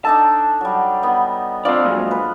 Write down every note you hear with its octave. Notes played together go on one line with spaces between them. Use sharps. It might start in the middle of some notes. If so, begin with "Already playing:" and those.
D4 D#4 A4 A5
F#3 G3
B3 D#4
F3 C4 D4 D5 F5
A#2 F#3 G#3
B4